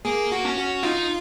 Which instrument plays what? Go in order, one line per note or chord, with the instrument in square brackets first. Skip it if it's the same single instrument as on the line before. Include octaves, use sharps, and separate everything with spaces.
[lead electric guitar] A#3 [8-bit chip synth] G#4
[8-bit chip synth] F#4
[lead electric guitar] C#4
[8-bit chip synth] F#4
[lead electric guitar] D#4 [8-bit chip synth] F4